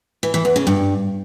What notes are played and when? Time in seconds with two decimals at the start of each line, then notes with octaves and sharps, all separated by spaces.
0.23 E3
0.34 E3
0.45 E2
0.56 C#3
0.67 G2